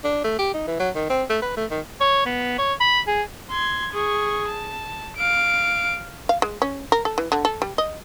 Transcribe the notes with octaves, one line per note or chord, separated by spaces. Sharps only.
D4
A3
G4
D#4
E3
F#3
D#3
C4
A3
B4
A3
D#3
C#5
B3
C#5
B5
G#4
C6 G#6
G#4 C#6
A5
F5 D7
F5
G#3
C#4
A#4
A4
E3
D3
A4
G3
D#5